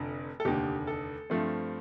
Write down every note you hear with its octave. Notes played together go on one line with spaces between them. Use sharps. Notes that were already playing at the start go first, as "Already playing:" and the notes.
Already playing: F1 F2 D3
A4
F1 D#2 D3 G4
A4
G2 F3 A3 C4